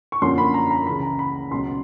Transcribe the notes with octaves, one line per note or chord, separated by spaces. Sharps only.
C#6
F#2 D3 F3 A#3 C#4 C6
B5
A#5
A#5
C#2 C#3 E3 B5
A#5
B5
C#2 B2 F#3 C6